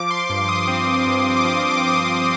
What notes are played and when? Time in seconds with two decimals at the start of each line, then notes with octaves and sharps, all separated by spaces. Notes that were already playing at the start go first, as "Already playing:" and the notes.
Already playing: F3 D6
0.11 C6
0.30 G2 D6
0.49 D#6
0.68 C4
1.06 G2
1.37 D6
1.44 F3 D#6
1.70 D6
1.82 G2
1.89 D#6
1.96 D6
2.21 C4 D#6